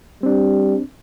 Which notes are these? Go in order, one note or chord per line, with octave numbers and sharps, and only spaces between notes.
G3 C4 D4